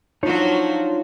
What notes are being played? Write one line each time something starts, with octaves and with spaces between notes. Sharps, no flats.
F3 F#3 D4 D#4 F4 F#4 C#5